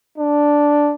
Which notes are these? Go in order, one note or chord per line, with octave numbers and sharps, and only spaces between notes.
D4